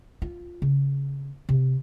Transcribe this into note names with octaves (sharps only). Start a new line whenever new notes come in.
F4
C#3
C3